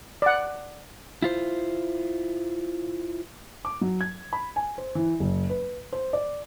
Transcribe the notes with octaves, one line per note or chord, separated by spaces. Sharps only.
D5 F#5
E4 F4 C5
D6
F#3
G#6
B5
G#5
C5
E3
F#1
B4
C5
D5